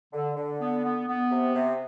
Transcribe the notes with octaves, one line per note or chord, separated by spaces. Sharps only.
D3
D3
B3
B3
B3
C3
C3